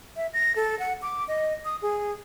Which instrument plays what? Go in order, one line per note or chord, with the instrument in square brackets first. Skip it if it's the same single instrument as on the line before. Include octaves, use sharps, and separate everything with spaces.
[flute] E5
A#6
A4
F#5
D6
D#5
D#6
G#4